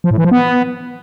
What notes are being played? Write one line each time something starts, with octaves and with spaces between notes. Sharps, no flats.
F3
A2
E3
F3
B3